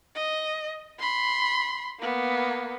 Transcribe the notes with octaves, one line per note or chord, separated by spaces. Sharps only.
D#5
B5 C6
A#3 B3